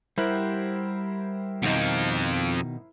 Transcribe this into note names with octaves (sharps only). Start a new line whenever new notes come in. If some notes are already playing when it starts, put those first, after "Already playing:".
G3 E4 G4 A#4 C5 F#5
F2 B2 D#3 F3 D#4